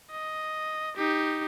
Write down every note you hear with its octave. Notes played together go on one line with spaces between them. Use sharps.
D#5
D#4 G4